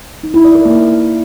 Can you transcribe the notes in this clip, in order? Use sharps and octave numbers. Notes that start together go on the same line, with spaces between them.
D#4
E4
D5
A#4
A#3